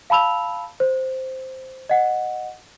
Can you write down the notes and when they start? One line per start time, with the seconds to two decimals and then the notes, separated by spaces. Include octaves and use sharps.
0.10 F5 A5 B5 E6 F7
0.80 C5
1.89 D#5 F#5